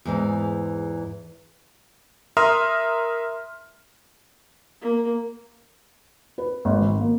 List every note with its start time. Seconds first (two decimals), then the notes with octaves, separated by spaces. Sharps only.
0.05 E2 G#2 E3
2.37 A#4 E5 A#5 C6 D#6 F6
4.81 A#3
6.38 B4
6.65 G#1
6.82 D#3
7.00 A#3